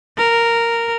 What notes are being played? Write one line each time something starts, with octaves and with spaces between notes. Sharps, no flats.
A#4